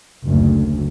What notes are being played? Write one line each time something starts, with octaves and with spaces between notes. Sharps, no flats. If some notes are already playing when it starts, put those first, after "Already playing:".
F#1 D2